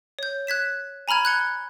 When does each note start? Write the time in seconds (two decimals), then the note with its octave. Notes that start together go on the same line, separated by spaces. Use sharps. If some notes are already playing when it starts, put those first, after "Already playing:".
0.19 C#5 G6
0.47 F#6 G#6 B6 E7
1.08 G#5 A#5 B5 F6 G#6
1.25 F#6 G#6 C#7 G7